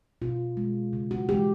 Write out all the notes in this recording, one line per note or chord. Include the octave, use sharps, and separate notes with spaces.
B2 F4
G#3
C#3
F#4
E3 G#3 G4